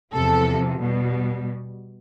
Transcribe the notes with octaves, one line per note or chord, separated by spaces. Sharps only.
E2 C3 F3 A4
B2 G3